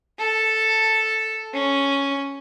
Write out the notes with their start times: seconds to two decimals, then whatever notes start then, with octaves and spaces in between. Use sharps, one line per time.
0.19 A4
1.53 C#4